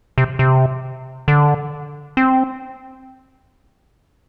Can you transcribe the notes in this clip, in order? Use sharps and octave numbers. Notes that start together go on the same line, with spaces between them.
C3
C3
D3
C4